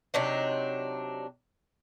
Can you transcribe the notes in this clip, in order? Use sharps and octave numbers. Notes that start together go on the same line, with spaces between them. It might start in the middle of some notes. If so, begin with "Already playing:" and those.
C3 F#3 D4 D#4